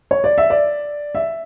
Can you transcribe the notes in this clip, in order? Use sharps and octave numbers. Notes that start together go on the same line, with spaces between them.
C#5
D5
E5
D5
E5